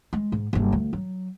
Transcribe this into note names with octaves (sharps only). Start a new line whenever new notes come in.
G#3
G#2
F#1 G2
D2
F#3